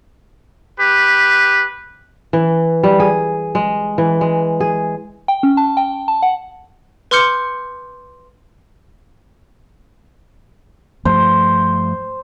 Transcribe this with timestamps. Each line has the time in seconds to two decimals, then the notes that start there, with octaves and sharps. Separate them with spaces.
0.78 G4 B4
2.33 E3
2.83 G3
3.00 G#4
3.55 G#3
3.98 E3
4.21 G#3
4.60 G#4
5.28 G5
5.43 C#4
5.57 A5
5.77 G5
6.08 A5
6.22 F#5
7.11 B4 C6 D6 F6 G6 C#7
11.05 G2 F3 A3 C5